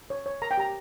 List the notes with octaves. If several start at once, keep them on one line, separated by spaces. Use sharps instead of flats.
C#5
C#5
A#4 A#5
G5
G4 A#5